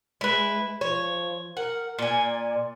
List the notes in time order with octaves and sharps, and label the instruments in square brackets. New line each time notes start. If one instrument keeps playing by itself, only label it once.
[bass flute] G#3 [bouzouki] E4 B4
[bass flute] F3 [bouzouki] C#5
[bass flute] A#4 [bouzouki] F#5
[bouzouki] A#2 G#5 [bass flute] D5